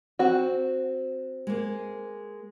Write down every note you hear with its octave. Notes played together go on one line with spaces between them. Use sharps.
C4 F#4
G#3 A#3